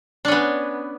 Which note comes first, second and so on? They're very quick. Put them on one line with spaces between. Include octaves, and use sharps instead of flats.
D4 C#4 B3